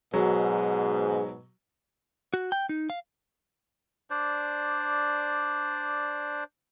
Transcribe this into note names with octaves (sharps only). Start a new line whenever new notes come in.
G#2 B2 F#3 G#4
F#4
G5
D#4
F5
D4 C5 D5